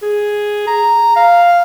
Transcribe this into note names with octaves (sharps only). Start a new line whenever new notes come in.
G#4
A#5
F5